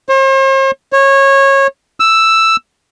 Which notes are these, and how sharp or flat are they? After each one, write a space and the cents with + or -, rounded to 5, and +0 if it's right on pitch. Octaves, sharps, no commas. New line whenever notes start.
C5 +45
C#5 -20
E6 +5